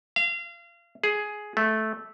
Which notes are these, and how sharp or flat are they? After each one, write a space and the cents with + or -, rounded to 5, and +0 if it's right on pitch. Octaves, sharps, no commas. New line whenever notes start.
F5 -30
G#4 +10
A3 -10